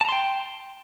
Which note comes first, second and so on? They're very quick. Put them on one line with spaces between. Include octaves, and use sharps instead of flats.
A5 A#5 C6 G5